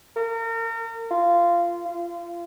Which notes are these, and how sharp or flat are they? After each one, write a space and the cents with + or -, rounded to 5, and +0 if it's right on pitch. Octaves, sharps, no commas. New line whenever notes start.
A#4 -35
F4 -15
F4 -30